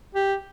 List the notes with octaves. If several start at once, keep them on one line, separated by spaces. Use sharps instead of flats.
G4